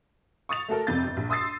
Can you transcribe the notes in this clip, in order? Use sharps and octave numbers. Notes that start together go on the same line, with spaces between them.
C#6 D#6 A6 F7
A3 F#4 A4 A#4
F1 F2 C3 G6 A6
G1
A#1
C6 D#6 E6 A6 C7